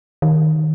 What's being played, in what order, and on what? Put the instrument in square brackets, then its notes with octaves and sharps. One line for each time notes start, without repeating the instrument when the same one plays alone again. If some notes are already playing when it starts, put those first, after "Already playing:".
[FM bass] D#3